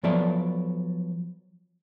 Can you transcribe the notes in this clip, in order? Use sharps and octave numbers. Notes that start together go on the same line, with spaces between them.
F3 F#3 B3 A4 D5 E5